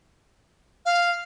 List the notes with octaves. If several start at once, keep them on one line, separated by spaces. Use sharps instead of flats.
F5